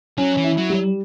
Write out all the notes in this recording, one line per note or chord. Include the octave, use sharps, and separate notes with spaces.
F#3 C#4
E3
E4
F#3
G3